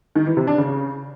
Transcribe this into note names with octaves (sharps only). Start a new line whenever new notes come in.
D#3
E3
C3
D4
C#3